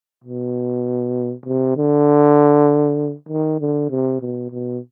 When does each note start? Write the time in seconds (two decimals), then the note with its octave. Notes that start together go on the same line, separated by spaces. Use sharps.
0.24 B2
1.46 C3
1.77 D3
3.29 D#3
3.60 D3
3.90 C3
4.21 B2
4.51 B2